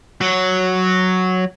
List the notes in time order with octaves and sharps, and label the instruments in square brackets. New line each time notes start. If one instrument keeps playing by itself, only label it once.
[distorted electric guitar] F#3 F#4